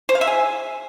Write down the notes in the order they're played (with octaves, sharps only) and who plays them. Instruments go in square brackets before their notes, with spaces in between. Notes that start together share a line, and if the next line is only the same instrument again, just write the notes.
[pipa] C5
F5
E5
G#4